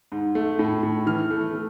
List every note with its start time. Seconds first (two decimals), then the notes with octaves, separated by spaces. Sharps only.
0.12 G#2
0.35 A3
0.59 A2
0.83 A2
1.06 E3 F6
1.30 A3
1.54 A3